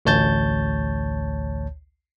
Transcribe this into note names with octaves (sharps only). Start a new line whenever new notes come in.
A1 D2 C#5 A5 G6 A6